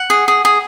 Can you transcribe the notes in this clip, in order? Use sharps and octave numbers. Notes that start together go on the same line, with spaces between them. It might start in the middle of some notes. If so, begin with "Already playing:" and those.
Already playing: F#5
G#4
G#4
G#4